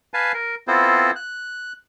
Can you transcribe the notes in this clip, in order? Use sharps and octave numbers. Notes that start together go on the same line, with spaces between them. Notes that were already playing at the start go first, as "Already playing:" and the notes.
B4 F5 G#5 A5
A#4
B3 C4 E4 F4 A4 C5
F#6